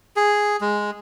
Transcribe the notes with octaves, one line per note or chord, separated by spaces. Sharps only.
G#4
G#3